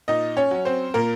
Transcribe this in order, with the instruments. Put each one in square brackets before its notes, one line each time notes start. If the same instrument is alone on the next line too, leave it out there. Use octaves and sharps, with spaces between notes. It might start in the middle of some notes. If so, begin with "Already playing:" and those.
[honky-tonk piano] A#2 D#4 D#5
C#4 C#5
F#3 C#4
C4 C5
A#2 A#3 A#4